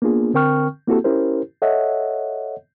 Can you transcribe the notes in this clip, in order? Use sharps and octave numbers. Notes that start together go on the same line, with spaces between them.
A#3 B3 D4 F4 G#4
D3 C4 A#4 G5 C#6 F6
A#3 C4 E4 F#4 G4 A4
C#4 E4 G4 A#4 C5
A4 C#5 D#5 E5 F#5